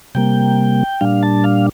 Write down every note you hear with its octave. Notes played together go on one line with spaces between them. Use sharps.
C3 G3 A#3 G5
A#2 G3 D4 F5
A5
F5